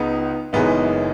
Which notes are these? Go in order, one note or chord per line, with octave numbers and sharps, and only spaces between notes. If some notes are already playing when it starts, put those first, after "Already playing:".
Already playing: C#2 C#3 B3 D#4
F#1 F#2 E3 G#3 B3 D#4